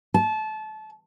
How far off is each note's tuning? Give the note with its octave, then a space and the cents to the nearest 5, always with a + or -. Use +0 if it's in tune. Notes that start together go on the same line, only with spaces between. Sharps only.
A5 -25